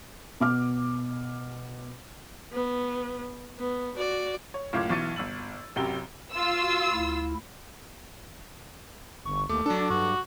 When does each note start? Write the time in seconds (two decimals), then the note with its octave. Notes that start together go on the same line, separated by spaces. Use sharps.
0.40 B2 D6 F6
2.53 B3
3.59 B3
3.96 F#4 D5
4.54 C#5
4.73 F#1 A2 F4 F5 D6 G#6
4.89 B1 E3 C#6 A6 C#7 D#7
5.16 G1 E6 F#7
5.76 A1 F#2 C3 G5 G7
6.32 F4 E6
6.61 F#4
6.93 D2 E4
9.25 G1 C#6
9.49 D#2 A3 D6
9.66 F#3 D4 A4
9.90 G2 F#4